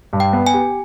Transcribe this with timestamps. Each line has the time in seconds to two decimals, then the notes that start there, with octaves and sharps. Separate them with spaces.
0.13 G2
0.20 G5
0.33 B3
0.47 G#5
0.54 G4